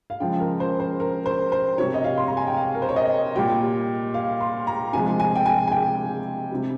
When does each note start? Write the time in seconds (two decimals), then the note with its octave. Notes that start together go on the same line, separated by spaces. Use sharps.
0.10 F5
0.20 C#3 F3 G#3 G5
0.40 A#4
0.60 C5
0.80 C5
1.00 A#4
1.26 C5
1.52 C5
1.78 C3 G3 C#5
1.94 D#5
2.04 F5
2.18 C6
2.28 A#5
2.37 G#5
2.47 G5
2.57 F5
2.75 A#4
2.82 C5
2.89 C#5
2.96 D#5
3.36 A#2 G3 G5
4.14 F5
4.41 C6
4.67 A#5
4.93 C3 F3 G#3 G#5
5.20 G#5
5.36 G5
5.46 G#5
5.67 G#5
5.72 G5
6.51 C3 G3